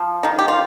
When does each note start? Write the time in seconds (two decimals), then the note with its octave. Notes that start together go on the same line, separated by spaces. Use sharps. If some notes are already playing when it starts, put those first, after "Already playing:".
Already playing: F3
0.23 D#3 D#4
0.39 G4
0.48 F4